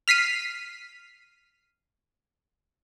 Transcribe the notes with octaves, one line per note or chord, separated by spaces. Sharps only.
F6 B6 C7 D#7